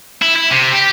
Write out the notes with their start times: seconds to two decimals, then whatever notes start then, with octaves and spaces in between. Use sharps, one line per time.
0.22 E4
0.35 E4
0.51 C3
0.73 G4